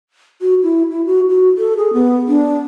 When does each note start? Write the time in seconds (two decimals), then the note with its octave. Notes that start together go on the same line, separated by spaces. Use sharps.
0.41 F#4
0.63 E4
0.91 E4
1.06 F#4
1.30 F#4
1.58 A4
1.77 G#4
1.93 B3
2.28 D4